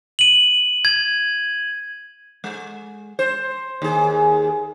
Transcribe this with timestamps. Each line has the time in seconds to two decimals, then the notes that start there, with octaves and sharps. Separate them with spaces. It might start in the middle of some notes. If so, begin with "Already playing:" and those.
0.19 D#7 F#7
0.85 G#6
2.44 G#3
3.19 C5
3.82 D#2 G#4